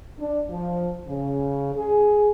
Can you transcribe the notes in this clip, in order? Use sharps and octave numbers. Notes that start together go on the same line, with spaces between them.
D4
F3
C#3
G#4